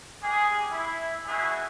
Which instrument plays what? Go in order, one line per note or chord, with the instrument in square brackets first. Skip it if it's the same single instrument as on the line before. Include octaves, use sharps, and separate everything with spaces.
[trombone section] G#3 G4 G#4
E4
B2 E4 F#4 G#4